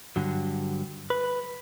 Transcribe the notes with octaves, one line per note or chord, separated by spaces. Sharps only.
G2 D3 F#3
B4